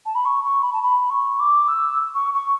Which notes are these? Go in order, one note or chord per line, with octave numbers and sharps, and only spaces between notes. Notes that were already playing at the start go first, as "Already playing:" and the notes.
A5
B5
C#6
C#6
B5
A5
B5
C#6
D6
E6
C#6
C#6